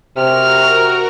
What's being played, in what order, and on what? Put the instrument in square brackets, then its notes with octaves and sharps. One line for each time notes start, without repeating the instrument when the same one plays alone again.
[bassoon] C3 [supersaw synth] F#4 A#4 A#5 [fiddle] F6